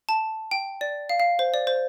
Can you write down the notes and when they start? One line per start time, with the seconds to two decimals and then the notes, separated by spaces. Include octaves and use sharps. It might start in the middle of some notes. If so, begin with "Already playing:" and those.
0.09 A5
0.51 G5
0.81 D5
1.09 F5
1.20 F5
1.39 C5
1.54 D5
1.67 C5